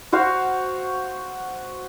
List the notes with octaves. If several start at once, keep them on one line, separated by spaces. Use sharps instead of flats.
F#4 C5 F5